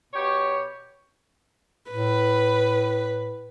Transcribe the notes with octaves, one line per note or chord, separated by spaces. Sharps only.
B2 G4 C#5
A2 B4